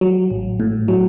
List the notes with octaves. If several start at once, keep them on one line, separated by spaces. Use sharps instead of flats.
F#3
A1
A2
F#3